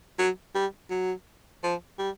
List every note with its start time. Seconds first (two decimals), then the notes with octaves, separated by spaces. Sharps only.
0.19 F#3
0.55 G3
0.90 F#3
1.63 F3
1.99 G3